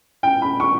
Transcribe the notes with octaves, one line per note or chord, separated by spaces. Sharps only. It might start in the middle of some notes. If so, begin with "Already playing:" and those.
G5
B5
C#6